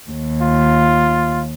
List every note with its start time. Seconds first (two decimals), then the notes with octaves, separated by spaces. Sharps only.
0.11 D#2
0.42 F4